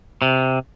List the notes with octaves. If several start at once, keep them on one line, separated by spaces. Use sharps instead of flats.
C3